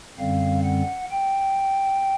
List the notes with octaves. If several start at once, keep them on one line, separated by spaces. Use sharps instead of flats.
F#2 D3 G3 C4 F5
F#5
G5